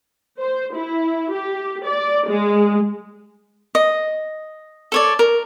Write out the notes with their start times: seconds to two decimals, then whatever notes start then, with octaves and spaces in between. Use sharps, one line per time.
0.40 C5
0.75 E4
1.31 G4
1.87 D5
2.28 G#3
3.75 D#5
4.92 A4 C#5 D5
5.19 A#4